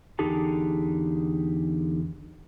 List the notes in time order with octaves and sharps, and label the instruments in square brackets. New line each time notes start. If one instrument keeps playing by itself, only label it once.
[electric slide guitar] E2 D3 D#4 G4 G#4 A5